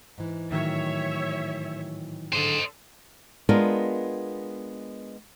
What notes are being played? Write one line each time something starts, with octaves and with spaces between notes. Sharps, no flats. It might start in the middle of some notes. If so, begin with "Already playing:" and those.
G#2 E3
A2 D#3 F#3 C#5 E5
G#2 D3 A4 C5 D#5
G#3 B3 D4 F4 A#4 D#5